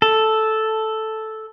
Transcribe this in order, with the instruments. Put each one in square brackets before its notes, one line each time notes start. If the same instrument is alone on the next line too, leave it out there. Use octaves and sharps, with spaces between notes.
[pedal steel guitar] A4